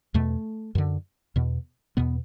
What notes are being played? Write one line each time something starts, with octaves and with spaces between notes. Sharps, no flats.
E2 B2 A3
F#2 D3
E2 B2
E2 B2 B3